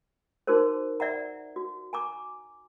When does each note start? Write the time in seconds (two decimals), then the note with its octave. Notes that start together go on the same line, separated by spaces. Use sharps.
0.47 D#4 F#4 G#4 A#4 C5
1.00 D5 E5 F#5 A#5
1.56 F#4
1.93 G#5 A#5 D6